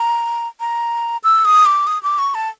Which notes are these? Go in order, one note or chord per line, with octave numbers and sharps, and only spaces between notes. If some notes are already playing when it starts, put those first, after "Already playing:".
Already playing: A#5
A#5
E6
D#6
D6
D#6
D6
C#6
A5